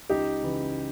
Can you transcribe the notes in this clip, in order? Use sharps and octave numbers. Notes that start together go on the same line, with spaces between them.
C#2 D#4 G4
C#3 E3